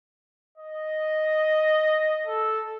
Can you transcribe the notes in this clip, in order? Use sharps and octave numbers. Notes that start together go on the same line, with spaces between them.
D#5
A4